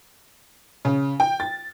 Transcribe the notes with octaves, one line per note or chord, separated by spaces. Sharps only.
C#3
G5
A6